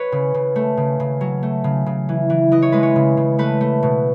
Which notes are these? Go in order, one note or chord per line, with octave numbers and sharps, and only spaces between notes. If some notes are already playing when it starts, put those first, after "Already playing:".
Already playing: B4 C#5
C#3
C#3
A3
C#3
C#3
F#3
A3
C#3
C#3
E3
E3
E3 D#5
C#5
G#3 B4
C#5
C#3
C#3
A3 B4
A3
B2